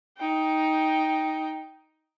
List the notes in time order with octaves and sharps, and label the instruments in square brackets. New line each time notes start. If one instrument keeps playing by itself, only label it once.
[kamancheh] D#4 G5